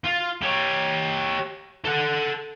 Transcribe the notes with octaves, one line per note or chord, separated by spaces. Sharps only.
F4
G4 C#5
A4 F#5